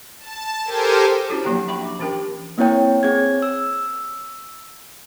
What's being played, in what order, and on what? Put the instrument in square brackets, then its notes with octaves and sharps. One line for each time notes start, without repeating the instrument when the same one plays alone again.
[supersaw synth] A5
G4 A4 A#4 C5 G#5
[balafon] C#4 D4 E4 F#4 G4 C#5
F3 F#3 A#3 G4 G5 A#5
E5 G5 B5 C#6
D4 D6
E3 C#4 G4 A#4 G5
[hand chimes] A#3 C4 E4 C#5 G5
C4 G#4 C#5 G#6
E6